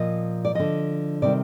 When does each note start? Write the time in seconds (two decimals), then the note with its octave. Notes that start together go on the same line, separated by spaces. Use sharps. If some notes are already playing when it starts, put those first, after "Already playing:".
Already playing: A#2 F3 D#5
0.45 D5
0.55 D3 F3 D#5
1.22 C3 D#3 G3 D5